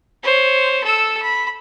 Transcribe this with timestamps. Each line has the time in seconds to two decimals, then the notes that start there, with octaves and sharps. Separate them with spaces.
0.23 C5 C#5
0.84 A4 E6
1.22 B5